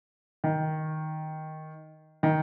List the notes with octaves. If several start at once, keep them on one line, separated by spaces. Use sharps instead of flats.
D#3
D#3